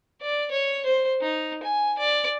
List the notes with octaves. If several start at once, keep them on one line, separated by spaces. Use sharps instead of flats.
D5
C#5
C5
D#4
G#5
D5